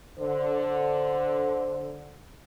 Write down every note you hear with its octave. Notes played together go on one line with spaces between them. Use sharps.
D3 C5